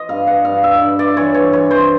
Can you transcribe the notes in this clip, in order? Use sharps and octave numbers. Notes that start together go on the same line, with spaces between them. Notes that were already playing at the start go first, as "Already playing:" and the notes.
Already playing: D#5
G2 F5
F#5
G2 F5
E5
G2
D5
E3 C#5
C#5
E3 C#5
C5